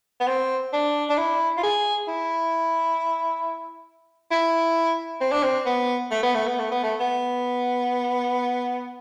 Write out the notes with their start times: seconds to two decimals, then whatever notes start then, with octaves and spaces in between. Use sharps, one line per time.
0.20 B3
0.28 C4
0.73 D4
1.10 D4
1.17 E4
1.57 F4
1.63 G#4
2.08 E4
4.31 E4
5.21 C4
5.32 D4
5.43 C4
5.66 B3
6.11 A3
6.23 B3
6.35 A3
6.47 B3
6.59 A3
6.71 B3
6.83 A3
7.00 B3